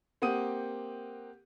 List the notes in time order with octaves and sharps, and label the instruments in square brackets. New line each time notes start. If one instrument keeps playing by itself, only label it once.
[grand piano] A#3 C4 G4 F#5 D#6 D#7